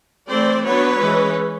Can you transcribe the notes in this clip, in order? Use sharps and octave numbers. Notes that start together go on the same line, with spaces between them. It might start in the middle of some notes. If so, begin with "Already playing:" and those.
E3 A3 C4 C5 D5
F#3 B3 D4 B4 C#5
E3 G#3 C#4